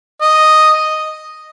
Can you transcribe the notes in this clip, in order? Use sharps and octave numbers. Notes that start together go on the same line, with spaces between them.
D#5